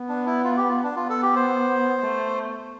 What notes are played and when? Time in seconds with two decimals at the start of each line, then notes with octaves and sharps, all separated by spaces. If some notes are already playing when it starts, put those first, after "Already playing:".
Already playing: B3
0.09 D4
0.26 E4
0.44 F4
0.57 G4
0.69 F4
0.83 D4
0.96 B3 F4
1.10 A4
1.23 G4
1.36 C5
2.01 A3